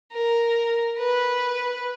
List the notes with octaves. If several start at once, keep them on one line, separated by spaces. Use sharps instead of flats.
A#4
B4